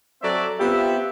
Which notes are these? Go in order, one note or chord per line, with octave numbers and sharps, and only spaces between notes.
F#3 C4 A4 C5 D5 E5
B3 C4 F4 G4 E5